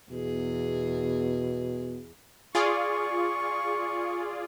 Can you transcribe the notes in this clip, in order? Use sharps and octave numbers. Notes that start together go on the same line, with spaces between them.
E2 B2 G#4
F4 G#4 D5 C#6